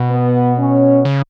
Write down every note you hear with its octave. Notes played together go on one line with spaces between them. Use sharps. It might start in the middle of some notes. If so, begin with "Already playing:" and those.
Already playing: B2
B3
C#4
C#3